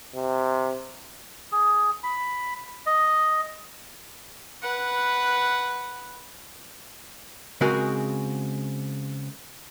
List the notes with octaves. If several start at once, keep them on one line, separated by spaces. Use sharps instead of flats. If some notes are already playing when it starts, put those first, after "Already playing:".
C3
G#4
B5
D#5
B4 F#5
C#3 G#3 C4 F#4 G#4 A#4